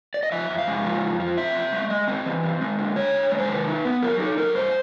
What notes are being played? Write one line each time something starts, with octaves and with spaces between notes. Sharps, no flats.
D5
D#5
F3 E5
F2
F5
G#3
F3
F2
F3
C4 E5
C4
G#3
G#3 D#5
C4
E3
C4
G#3
D3
D3 C#5
D3
G#3
C5
D#3 B4
D#4
B3
F#3 A#4
D#4 A4
F#3 A#4
G2 C5